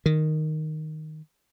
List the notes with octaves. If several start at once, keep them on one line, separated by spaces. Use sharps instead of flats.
D#3